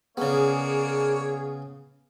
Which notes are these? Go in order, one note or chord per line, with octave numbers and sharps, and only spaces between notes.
C#3 A#3 B3 D4 G#4 C#5